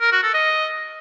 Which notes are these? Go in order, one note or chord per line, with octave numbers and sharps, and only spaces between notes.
A#4
F#4
A4
D#5